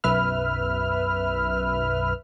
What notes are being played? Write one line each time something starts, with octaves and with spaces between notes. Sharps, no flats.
B1 F#2 B4 E5 F6